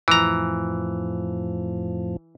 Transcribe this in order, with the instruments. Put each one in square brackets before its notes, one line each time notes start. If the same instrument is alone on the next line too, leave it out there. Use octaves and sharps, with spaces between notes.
[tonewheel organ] F2 A2 F3 [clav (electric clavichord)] E3 A#5